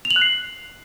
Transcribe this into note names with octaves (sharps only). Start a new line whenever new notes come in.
F7
F#7
F#6
C7